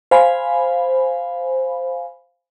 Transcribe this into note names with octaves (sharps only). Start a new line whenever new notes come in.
C5 F5 G#5 B5